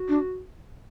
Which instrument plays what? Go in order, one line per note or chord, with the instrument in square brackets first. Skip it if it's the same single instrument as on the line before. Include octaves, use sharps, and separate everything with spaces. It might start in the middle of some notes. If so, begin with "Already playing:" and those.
Already playing: [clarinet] F#4
[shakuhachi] D4